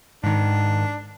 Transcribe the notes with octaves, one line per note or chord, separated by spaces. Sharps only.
G#2 D#3 D4